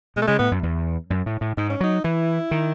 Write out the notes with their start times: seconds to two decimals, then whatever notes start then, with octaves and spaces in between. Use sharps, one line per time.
0.16 B2 G#3
0.22 A3
0.27 C#3 G#3
0.39 A2 B3
0.51 F#2
0.63 E2
1.10 F#2
1.26 A2
1.41 A2
1.57 G#2 D#4
1.70 C#4
1.81 F#3 D#4
2.04 E3 E4
2.51 D#3